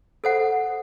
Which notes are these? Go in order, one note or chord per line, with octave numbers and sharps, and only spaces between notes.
A4 C5 F#5